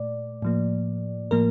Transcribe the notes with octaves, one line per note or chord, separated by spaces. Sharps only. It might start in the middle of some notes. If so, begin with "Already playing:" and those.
Already playing: A#2 A3 D5
A2 F3 A#3
A2 F3 A#3 A#4